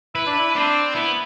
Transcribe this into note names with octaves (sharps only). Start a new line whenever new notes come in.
E4 B4
D4
E4
C4 D4
B3 E4